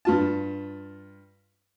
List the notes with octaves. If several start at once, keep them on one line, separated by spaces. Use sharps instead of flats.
G2 F4 A5